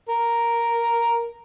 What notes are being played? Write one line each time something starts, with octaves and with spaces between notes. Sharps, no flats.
A#4